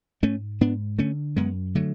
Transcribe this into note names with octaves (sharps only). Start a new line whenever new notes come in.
G#2 A3 C#4
G#2 B3 D4
D3 A3 C#4
F#2 G#3 B3
D3 F#3 A3